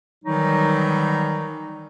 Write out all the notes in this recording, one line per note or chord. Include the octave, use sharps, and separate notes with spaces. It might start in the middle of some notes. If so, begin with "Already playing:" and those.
D#3 E3 F#3 G3 D#4